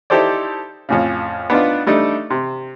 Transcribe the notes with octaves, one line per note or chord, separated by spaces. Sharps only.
D#4 E4 G4 A4 C5 D5
F2 A2 C#3
B3 D4 D#4 F4
G3 A3 D4 D#4
C3